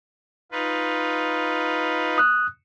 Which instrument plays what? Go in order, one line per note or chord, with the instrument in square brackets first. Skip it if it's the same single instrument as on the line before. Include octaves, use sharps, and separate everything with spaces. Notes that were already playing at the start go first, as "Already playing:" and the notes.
[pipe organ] D#4 F4 B4
[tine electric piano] D#6 F#6